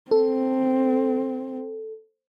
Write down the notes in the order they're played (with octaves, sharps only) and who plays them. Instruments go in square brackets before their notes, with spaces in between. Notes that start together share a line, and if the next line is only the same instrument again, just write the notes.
[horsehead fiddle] C4 [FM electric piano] A4